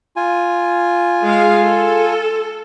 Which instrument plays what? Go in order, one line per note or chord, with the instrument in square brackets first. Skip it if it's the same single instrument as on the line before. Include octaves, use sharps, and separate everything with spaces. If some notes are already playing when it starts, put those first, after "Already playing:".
[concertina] F4 G#5
[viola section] G#3 G#4 F5
A4